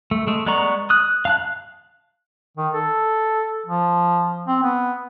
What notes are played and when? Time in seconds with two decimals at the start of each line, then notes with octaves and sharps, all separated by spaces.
0.11 A3
0.27 G#3 A3
0.46 G#3 B3 D5 A#5 C#6
0.90 D#6 F#6
1.25 F5 A5 F#6
2.57 D#3
2.73 A4
3.66 F3
4.47 C4
4.63 B3